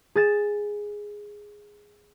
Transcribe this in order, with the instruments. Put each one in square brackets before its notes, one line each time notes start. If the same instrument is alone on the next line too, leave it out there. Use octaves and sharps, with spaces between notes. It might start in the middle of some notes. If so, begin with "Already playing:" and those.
[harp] G#4 A6 E7